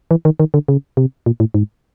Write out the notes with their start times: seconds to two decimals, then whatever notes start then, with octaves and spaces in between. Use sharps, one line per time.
0.11 E3
0.25 D#3
0.40 D#3
0.54 D3
0.68 C#3
0.97 C3
1.26 A#2
1.40 A2
1.54 G#2